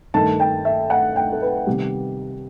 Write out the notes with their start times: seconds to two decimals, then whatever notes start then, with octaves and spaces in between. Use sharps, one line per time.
0.14 G2 D#3 A3 A5
0.40 G5
0.65 E5
0.90 F#5
1.16 G5
1.32 A4
1.42 B4
1.67 C3 D#3 G3 B3 G4